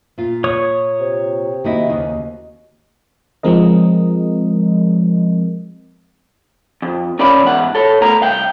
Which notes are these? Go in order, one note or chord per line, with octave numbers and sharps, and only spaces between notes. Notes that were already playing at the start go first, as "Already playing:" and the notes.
A#2 F4
C#5 C#6 D#6
C3
D#3 A#3 D#4 E4 F#4 D#5
D#2 C#3
F3 G#3 C4 A#4 D#5
F2
C#4 A#4 C#5 D5 F5 B5
E2 G#2 F#5
A4 C#5
A3 B3 A#4 A#5
C2 F5 G5